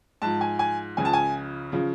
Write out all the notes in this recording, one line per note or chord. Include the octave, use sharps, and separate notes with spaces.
G#2 F3 A5
G#5
G#5
C#2 C#3 F3 G#5
A5
G#5
C#3 F3